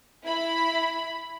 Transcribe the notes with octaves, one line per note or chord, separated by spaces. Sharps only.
E4 B5